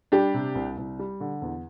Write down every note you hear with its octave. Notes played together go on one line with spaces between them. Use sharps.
G3 D4 G4
C3
C2
C2
G3
D3
E2